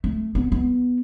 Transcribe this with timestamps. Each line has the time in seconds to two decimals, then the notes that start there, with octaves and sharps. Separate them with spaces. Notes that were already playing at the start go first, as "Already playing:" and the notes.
0.04 A3
0.35 B3
0.52 B3